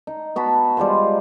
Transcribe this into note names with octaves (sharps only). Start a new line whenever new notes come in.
D#4
B3 F#4 A5 B5
G3 G#3 F4 C5